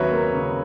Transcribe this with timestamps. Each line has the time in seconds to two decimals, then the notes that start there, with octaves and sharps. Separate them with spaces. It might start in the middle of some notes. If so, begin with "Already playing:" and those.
Already playing: D#2 C#3 F#3 B4 C#5 E5
0.11 A#3
0.33 C#3